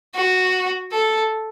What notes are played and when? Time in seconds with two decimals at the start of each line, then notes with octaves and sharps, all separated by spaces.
0.15 F#4
0.92 A4